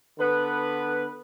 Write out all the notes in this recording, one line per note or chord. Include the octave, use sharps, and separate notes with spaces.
D3 B3 B4